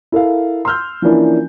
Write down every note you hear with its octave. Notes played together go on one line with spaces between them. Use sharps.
E4 A4 A#4 F5
C6 E6 F6 G6
E3 F3 A#3 C#4 D4 E4